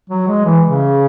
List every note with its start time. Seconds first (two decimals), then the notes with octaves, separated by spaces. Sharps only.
0.10 F#3
0.28 G#3
0.45 E3
0.64 C#3